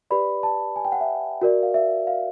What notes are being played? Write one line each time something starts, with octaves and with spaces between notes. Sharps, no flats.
G4 B4 D5 B5
A5
G#5
G5
F#5
E5
F#4 A#4 D5
F5
E5
F5